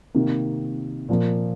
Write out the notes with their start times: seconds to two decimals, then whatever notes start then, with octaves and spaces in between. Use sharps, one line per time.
0.14 C3 D#3 A#3
1.09 A#2 F3 A#3 F4